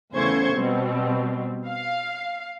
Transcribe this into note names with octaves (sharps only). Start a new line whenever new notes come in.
E2 C#3 A3 C5 C#6 G#6
B2 G3 C4
F5